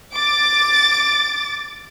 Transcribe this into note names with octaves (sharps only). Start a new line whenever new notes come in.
D6 A6